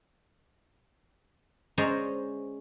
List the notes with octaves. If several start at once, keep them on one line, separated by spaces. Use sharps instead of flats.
G#3 C#4 C5 D5 A#5